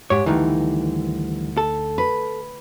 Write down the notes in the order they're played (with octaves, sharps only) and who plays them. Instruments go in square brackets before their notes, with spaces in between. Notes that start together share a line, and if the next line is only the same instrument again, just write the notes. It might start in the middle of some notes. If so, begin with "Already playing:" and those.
[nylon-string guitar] G#2 [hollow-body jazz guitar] G4 C#5
[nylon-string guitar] D2 D#4 [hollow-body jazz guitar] G2 D#3 E3
[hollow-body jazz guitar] A4
[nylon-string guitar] B4